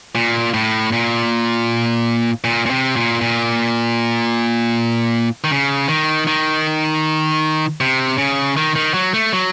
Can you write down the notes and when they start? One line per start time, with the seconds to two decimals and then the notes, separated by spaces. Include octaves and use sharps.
0.15 A#2
0.54 A2
0.92 A#2
2.44 A#2
2.66 A#2
2.70 C3
2.96 A#2
3.21 A#2
5.44 D#3
5.51 C#3
5.88 D#3
6.27 D#3
7.80 C3
8.18 C#3
8.57 D#3
8.75 D#3
8.94 F#3
9.14 A3
9.33 F#3